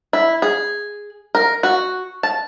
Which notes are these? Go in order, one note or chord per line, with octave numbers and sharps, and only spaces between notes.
E4
G#4
A#4
F#4
A5